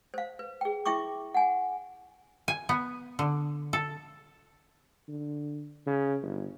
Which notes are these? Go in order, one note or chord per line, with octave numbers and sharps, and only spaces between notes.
C5 F5
B4
G#4 G5
E4 E5 G5 C#6 D6
F#5 G#5
G#5
B3
D3
A4
D3
C#3
G1